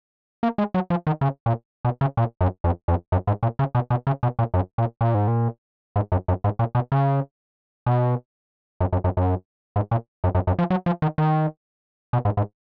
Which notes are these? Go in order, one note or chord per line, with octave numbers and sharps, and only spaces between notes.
A#3
G#3
F#3
F3
D#3
C#3
A#2
B2
C#3
A#2
F#2
F2
F2
F#2
G#2
A#2
C#3
B2
B2
C#3
B2
A#2
F#2
A#2
A#2
G#2
A#2
G#2
F#2
F#2
G#2
A#2
B2
C#3
B2
F#2
F#2
F#2
F#2
G#2
A#2
F#2
F#2
F#2
F3
F#3
F3
D#3
D#3
B2
G#2
G#2